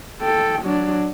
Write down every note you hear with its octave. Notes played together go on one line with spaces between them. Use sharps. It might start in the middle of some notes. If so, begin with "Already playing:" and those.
A4 G5
F#3 D4